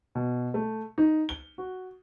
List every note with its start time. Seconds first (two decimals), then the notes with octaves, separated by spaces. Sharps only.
0.15 B2
0.54 A3
0.98 D#4
1.29 G7
1.58 F#4